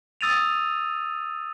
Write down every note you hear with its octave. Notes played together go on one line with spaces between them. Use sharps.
D#6 E6 A6 D#7 F7